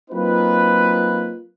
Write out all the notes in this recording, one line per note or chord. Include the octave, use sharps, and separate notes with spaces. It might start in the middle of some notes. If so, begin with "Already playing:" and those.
F#3 A#3 C4 D#4 F4 B4